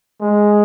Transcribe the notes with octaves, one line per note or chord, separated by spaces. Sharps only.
G#3